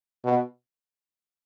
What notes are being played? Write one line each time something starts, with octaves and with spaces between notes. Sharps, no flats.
B2